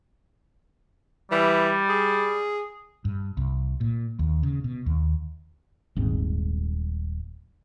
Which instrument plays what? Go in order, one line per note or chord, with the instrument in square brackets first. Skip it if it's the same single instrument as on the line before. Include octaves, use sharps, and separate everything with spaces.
[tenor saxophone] E3 [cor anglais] G3
[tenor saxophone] G#4
[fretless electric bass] G2
C2
A#2
D#2
C#3
B2
D#2
D#1 G#1 G#2 C4